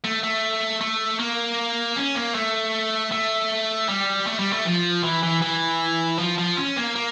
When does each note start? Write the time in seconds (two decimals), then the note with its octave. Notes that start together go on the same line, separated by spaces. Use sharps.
0.04 A3
0.23 A3
0.81 A3
1.19 A#3
1.96 C#4
2.15 A#3
2.34 A3
3.12 A3
3.88 G3
4.27 A3
4.39 G3
4.53 A3
4.65 F3
5.03 E3
5.23 E3
5.42 E3
6.18 F3
6.38 F3
6.57 C#4
6.76 A#3
6.95 A#3